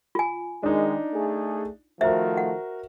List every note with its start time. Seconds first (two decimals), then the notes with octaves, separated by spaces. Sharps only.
0.15 F4 G#5
0.63 D#3 G#3 D4 D#4
1.13 A3 G#4
2.01 D#3 F3 A3 F#4 A#4 C5 E5
2.37 F#5